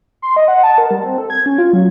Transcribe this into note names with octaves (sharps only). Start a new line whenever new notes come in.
C6
D#5
F#5
A5
A#4
G3
C4
A4
G#6
C#4
F4
F#3